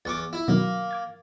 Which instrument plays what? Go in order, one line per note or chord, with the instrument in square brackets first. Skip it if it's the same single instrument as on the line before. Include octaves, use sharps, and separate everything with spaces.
[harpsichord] E2 C#6 D6 [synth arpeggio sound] A6
[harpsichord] E4
[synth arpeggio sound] B2 D#3 F#3 [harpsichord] A#3
[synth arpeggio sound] D6 G#6 A6